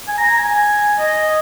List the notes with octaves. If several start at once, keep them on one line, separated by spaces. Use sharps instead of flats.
G#5
A#5
A#5
G#5
D#5